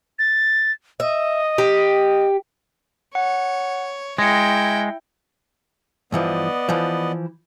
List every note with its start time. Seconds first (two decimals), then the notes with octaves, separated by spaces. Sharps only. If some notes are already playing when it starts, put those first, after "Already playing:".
0.19 A6
1.00 D#5 E5
1.58 G4
3.15 C#5 F#5
4.18 G#3 E4 G5 A#6 C#7
6.12 G2 E3 F3 B3 D5 D#5
6.69 E3 F3